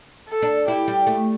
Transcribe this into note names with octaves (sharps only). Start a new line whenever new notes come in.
A4
D4
E4 G4
G3
A3